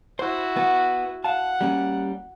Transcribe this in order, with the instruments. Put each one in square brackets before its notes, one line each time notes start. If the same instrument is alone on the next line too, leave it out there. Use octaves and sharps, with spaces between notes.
[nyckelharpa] E4 F#4 [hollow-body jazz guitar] C5
[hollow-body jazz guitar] B3 F#5
[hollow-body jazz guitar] F5 A5 [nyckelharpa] F#5
[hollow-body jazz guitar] G3 A#3 C#4